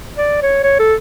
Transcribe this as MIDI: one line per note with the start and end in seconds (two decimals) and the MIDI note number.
0.17 0.42 74
0.42 0.61 73
0.64 0.77 73
0.79 0.95 69